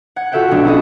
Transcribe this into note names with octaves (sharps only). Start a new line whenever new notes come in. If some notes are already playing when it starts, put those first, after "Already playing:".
F#5 G#6
F4 F#4 A4 E5 F#5 G5
B1 G#3 D4 A4 G#6
C#4 E4 F#4 G#4 A4 D#5